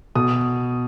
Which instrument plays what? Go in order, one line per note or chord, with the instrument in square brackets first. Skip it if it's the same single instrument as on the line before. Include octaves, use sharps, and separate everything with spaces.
[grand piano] B2 D#6